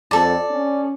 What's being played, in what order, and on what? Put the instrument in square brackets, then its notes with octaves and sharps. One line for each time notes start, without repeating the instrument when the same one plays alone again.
[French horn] F2 [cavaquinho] A4 D5
[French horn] C#4